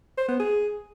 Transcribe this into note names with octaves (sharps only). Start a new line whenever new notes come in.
C5
B3
G#4